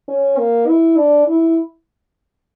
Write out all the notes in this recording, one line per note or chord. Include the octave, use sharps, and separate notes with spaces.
C#4
A#3
E4
D4
E4